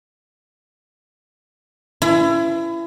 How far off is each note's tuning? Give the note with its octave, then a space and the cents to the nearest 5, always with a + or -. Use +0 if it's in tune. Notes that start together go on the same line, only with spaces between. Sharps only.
E4 +30